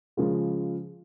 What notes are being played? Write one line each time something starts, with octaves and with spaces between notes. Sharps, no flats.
C#3 F3 G#3